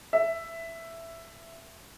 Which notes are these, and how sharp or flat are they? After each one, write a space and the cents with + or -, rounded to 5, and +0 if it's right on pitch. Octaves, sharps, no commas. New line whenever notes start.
E5 +10